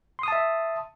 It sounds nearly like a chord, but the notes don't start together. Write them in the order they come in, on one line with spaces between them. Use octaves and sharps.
C6 D#6 A5 E5